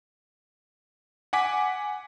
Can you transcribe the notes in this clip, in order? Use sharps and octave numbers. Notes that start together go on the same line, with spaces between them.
F#5 G#5 D6 B6